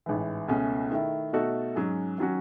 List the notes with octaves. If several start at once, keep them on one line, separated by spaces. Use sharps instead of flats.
A1 G#2 E3
C#2 B2 A3 C#4 G#4
D#3 A3 E4
B2 A3 D#4 F#4 A4
G#2 F#3 C#4 G#4
D#3 F#3 C#4 F#4